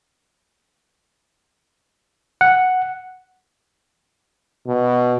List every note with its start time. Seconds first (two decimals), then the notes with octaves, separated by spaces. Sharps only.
2.41 F#5
4.67 B2